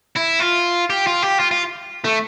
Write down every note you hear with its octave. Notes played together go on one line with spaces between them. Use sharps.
E4
F4
G4
F4
G4
F4
F4
A3